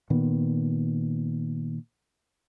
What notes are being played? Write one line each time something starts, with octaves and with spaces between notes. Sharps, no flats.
A#2 D#3 B3